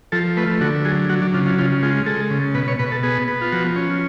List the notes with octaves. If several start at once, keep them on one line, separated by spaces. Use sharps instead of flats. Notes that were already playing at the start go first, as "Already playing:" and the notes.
F3 A4
A3 B4
D3 F#4
F#3 G#4
F#3 F#4
D4
C#3 F4
F4
C#3 F4
G#3 F4
G#3 A4
C#3
B2 B4
C#5
B2 B4
A4
B3 G#4
B3
F4
F3 F#4
C#4